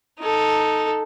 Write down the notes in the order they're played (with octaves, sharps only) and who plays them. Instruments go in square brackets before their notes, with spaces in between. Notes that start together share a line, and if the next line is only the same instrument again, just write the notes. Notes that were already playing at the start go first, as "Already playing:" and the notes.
[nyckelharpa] D#4 A4